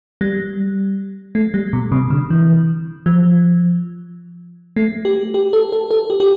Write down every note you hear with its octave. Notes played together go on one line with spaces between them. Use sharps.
G3
A3
G3
B2
C3
D3
E3
F3
A3
G4
G4
A4
A4
A4
G4
G4